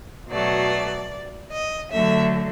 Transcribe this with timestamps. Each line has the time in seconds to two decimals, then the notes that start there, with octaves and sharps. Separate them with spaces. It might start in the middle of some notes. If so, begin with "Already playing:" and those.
0.30 B2 F#3 A3 D5
1.52 D#5
1.91 D3 F#3 A3 E5